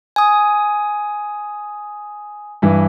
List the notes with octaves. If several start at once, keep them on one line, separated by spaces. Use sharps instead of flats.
G#5 D#6
G2 E3